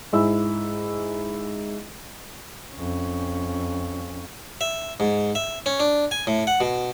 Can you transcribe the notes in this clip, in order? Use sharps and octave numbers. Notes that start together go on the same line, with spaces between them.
G#2 G#3 E4 E6
F2 C#4
E5
G#2
E5
C#4
D4
G#5
A2
F#5
B2